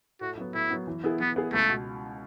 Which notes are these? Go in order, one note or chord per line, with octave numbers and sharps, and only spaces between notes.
A2 F#4
F#3 B3
A2 E4
F#3 B3
E3
B3 E4 G#4
E3 B3
B3 E4 G#4
C#2 A3
B2